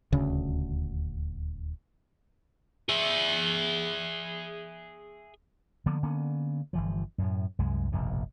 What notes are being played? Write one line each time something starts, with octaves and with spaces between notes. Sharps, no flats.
D#1 D2 C#3 C#4
G#4 E5
D3 F3 A#3 B3
D3 A#3 B3 C#4
G1 E3 F3
F#2 A2
C2 F#2 G#3
F1 A#1 G2 B2